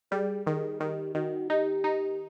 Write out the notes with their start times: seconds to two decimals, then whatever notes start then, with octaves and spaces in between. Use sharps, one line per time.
0.12 G3 G#4
0.46 D#3 G#4
0.80 D#3 G4
1.15 D#3 F#4
1.50 D#4 G4
1.84 D#4